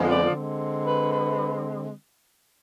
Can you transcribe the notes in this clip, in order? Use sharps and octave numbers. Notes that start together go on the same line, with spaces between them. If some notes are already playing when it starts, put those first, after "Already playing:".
Already playing: F2 D3 F3 G#3 B3
D5
D3 G#3 C4
B4
B4